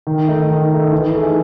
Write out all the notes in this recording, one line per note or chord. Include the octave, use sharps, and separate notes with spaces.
D#3
A3 D#4
D#3
A3 D#4
E3
A3 D#4 G#4